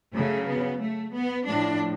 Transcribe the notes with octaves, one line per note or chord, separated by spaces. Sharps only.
C#3 F#3 A3
B3
A3
B3
A2 F3 D4